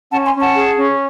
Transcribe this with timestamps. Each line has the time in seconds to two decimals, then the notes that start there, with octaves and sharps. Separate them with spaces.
0.12 C#4 F#5 A5
0.26 G#5 C6
0.34 C#4
0.41 F#5 A5
0.55 G#4
0.77 C#4